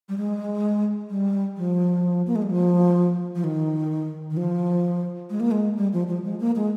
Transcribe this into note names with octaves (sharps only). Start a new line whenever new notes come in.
G3
G#3
G3
F3
A#3
G#3
G3
F3
F3
D#3
D#3
F3
G#3
A#3
G#3
G3
F3
F3
G#3
A#3
G#3